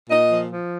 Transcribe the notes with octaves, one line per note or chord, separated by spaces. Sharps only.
A#2 D#5
F3
F3